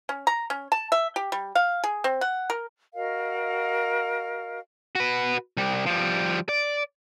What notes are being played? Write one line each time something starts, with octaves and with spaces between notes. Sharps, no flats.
C#4
A#5
C#4
A5
E5
G4
G3
F5
G#4
C4
F#5
A#4
F#4 A#4 D#5 F5
F#4 B4
C2 G3
F3 G3
D5